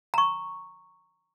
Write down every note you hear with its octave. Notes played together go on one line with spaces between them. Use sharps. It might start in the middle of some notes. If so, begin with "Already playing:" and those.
A#5 C#6